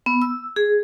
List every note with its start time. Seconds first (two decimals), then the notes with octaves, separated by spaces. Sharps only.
0.06 B3
0.22 E6
0.56 G#4